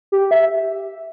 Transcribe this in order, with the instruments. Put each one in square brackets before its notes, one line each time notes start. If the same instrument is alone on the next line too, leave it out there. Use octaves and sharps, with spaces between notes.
[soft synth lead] G4
E5